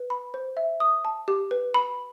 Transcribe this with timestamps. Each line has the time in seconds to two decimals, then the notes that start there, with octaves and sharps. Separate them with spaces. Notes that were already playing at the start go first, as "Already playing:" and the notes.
Already playing: B4
0.10 B5
0.34 C5
0.57 E5
0.80 D#6
1.05 A5
1.28 G4
1.51 B4
1.74 B5